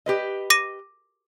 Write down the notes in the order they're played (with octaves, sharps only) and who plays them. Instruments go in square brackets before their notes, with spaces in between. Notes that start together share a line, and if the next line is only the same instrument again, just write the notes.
[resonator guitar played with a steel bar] G4 B4 D#5
[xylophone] D6 A#6 D#7